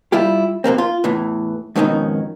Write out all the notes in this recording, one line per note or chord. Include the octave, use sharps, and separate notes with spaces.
G3 E4 F4 G4
F#2 B2 A#3 C4
F4
E2 A2 E3
F2 G#2 B2 D#3 C#4 D#4